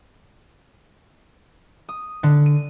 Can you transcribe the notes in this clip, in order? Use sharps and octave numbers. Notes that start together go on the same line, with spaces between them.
D#6
D3
D#7